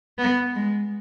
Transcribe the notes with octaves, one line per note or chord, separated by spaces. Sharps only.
B3
G#3